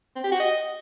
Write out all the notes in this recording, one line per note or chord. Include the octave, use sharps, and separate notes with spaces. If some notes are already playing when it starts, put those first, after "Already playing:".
C4
G4
F#4
D#5